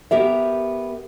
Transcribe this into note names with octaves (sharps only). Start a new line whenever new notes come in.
B3 G4 A#4 E5